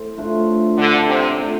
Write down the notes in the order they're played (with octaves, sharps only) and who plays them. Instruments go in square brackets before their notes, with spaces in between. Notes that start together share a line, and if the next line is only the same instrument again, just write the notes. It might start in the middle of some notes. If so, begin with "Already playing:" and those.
Already playing: [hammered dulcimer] A2 C4
A3 D4 F4
[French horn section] D3
C3
[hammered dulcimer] A#2 A3 C4